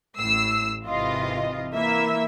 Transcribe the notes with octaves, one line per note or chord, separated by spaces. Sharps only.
A1 A2 E6 C7
G#1 C3 E3 F4 D#5
E3 A#3 E4 E5 E6